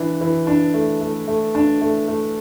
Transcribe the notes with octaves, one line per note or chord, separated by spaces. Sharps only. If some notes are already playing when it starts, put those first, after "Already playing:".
Already playing: E3 D4
E3
D4
A3
A3
A3
D4
A3
A3